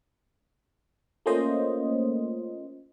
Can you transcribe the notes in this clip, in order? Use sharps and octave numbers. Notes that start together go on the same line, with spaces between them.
A3 A#3 C#4 F4 C5 D#5